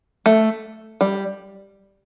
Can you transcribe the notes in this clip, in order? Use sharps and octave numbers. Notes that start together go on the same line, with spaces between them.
A3
G3